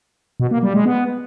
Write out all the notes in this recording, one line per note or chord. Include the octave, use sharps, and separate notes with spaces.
B2
A#3
G3
G#3
B3